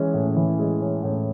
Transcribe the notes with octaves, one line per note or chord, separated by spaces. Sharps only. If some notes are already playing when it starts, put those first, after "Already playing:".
Already playing: E3 G#3 C#4
A2
E3
G#3
C#4
A2